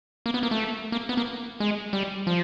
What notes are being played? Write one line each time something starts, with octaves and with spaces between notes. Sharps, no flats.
A#3
B3
A#3
A3
A#3
B3
A#3
G#3
G3
F3